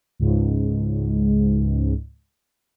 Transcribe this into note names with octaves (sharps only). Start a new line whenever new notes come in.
C#2 G#2